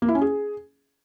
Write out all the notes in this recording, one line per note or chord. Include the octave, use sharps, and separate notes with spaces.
A#3
E4
C#4
G#4